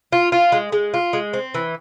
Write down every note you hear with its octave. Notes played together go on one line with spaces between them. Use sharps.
F4
F4
G#3
G#3
F4
G#3
C4
E3